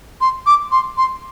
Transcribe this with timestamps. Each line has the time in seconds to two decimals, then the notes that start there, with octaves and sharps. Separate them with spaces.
0.21 C6
0.46 D6
0.72 C6
0.98 C6